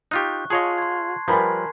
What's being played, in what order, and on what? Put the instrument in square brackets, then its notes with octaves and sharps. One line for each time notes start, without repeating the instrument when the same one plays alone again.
[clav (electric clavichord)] D#4 F4 G4 [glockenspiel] C#6 F#6
[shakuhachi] F4 [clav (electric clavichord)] G#4 C#5 D#5 [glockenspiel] A5 C6 C7
[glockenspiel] C6 G#6
[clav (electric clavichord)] F3 G3 [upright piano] A#4 G#5 B5 [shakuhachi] B4